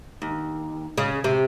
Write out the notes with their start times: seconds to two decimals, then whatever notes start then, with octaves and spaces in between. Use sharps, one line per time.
0.22 D#2
0.98 C#3
1.24 C3